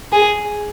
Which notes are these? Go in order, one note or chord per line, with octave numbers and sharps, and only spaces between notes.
G#4